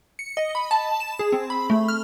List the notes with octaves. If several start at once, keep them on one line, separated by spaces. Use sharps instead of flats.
C#7
D#5
B5
A5
E7
G#4
C4
B5
A3
F6